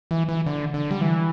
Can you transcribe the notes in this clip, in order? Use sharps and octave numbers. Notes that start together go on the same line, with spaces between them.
E3
E3
D3
D3
G3
E3